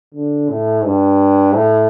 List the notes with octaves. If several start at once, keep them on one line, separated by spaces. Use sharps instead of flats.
D3
A2
G2
A2